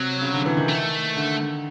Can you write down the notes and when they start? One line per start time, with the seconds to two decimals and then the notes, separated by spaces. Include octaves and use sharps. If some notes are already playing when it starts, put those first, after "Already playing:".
Already playing: C3 F#3
0.22 C#3
0.34 D3
0.46 E3
0.57 D#3
0.69 A3
1.17 D3